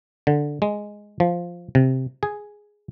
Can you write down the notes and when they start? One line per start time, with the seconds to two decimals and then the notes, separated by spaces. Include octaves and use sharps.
0.27 D3
0.62 G#3
1.20 F3
1.75 C3
2.23 G#4